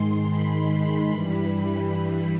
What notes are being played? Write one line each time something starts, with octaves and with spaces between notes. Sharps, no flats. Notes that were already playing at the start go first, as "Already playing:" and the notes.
Already playing: G#2 D#3 G#3 C6
B5
G2 E3 G3